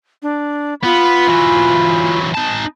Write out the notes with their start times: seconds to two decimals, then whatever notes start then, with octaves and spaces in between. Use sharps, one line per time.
0.23 D4
0.84 B3 F4 B5
1.29 E3 F#3
2.34 D#4 A5